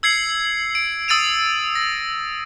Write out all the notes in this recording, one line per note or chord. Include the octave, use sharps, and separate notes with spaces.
E6 G#6 C7 C#7 F#7
D7
D#6 E6 A6 D7 D#7 F7
A#6